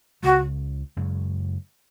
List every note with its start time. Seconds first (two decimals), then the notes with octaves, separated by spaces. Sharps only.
0.23 C#2 C#3 G#3 F#4
0.97 F#2 C#3 G#3